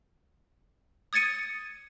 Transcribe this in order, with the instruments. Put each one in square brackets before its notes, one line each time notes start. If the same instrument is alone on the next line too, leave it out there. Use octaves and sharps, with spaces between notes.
[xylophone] D#6 G#6 A6 C#7 D#7